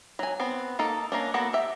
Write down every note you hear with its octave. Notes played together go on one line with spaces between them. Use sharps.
F#3 G#5
B3 C4
A#3 D#4 A4
A#3 C#4 D4
A#3 B3 F#4 A4 F#5
G4 E5